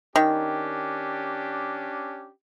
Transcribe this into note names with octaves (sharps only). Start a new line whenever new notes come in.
D#3 C#4 D4 G4